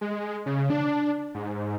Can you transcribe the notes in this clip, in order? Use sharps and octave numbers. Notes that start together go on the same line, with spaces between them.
G#3
C#3
D4
G#2